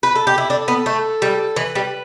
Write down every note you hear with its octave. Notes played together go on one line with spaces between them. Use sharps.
B4
A4
G4
E4
D4 A4
B3
A3
G3
E3 B4
G3